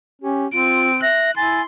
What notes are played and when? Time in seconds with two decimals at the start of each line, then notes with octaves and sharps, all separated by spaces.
0.22 C#4 G4
0.53 C4 F4 D7
1.02 E5 F#6 A#6
1.37 E4 G#5 C6 A6